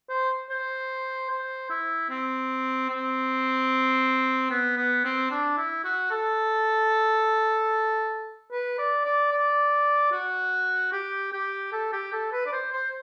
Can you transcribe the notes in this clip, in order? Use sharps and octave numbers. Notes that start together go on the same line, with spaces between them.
C5
C5
C5
E4
C4
C4
B3
B3
C4
D4
E4
F#4
A4
B4
D5
D5
D5
F#4
G4
G4
A4
G4
A4
B4
D5
C5
C5